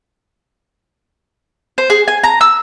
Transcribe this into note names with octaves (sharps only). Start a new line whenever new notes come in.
C5
G#4
G#5
A#5
E6